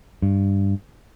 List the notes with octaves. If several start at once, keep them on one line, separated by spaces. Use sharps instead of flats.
G2